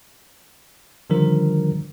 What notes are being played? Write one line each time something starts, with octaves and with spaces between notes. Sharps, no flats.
D3 D#3 F3 G3 D4 A#4